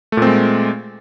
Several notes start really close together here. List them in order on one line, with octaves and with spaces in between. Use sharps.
A3 A#2 C4 G#3